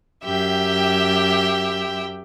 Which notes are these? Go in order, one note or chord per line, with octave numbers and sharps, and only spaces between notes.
F#2 G4 E5 G5